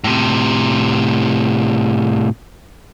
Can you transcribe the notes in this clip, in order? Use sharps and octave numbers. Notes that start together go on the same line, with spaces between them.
A2 C3